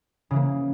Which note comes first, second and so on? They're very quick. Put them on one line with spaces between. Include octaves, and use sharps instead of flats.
C#3 E3 A#3